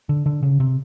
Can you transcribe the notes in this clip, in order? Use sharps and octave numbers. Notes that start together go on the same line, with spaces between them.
D3
D3
C#3
C3